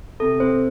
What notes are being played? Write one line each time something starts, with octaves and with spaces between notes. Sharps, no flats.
C3 A4
C4 C5